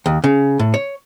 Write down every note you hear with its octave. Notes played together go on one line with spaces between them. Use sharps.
D#2
C#3
A2
C#5